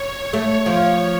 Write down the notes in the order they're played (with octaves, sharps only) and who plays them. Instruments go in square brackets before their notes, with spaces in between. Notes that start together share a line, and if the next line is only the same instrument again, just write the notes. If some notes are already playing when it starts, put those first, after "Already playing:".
Already playing: [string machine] C#5
[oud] A3
F3